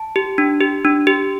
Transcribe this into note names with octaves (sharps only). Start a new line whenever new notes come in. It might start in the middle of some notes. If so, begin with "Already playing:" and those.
Already playing: A5
G4
D4
G4
D4
G4